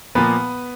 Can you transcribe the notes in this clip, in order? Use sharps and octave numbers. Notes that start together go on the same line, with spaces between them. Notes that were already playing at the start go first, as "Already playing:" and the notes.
A#2 F3 A#3 B3 B4